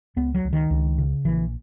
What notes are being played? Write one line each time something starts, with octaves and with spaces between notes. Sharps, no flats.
C#2 B3
F#3
C#2
D#3
C#2
C#3
A#1 E3